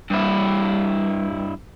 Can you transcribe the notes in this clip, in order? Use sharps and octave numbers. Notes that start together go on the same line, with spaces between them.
G2 E4